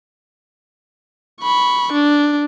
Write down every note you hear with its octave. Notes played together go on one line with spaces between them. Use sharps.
B5 C#6
D4